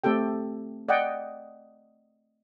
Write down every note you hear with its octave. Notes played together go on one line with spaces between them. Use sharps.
A3 C4 G4 A4 G5
D5 D#5 F#5 G5